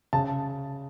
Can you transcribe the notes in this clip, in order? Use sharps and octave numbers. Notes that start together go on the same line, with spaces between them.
C#3 A5